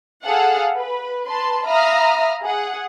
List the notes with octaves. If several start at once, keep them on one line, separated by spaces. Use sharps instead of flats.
G#4 A4 F5 F#5
B4
B4 A5 C6
E5 F5 A#5 B5 D#6 F6
G#4 F#5